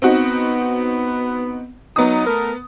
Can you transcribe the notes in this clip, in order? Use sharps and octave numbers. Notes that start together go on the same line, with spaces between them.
B3 C4 D#4 F#4
F#3 B3 D#4 D#6
A3 A#4